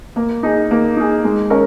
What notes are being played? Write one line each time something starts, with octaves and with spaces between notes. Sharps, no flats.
A#3
D#4 G#4
A#3
D#4 G#4
G#3
C#4 A#4 C#5